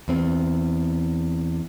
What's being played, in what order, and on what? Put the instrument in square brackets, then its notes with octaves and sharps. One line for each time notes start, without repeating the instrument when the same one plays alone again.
[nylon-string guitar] E2 C4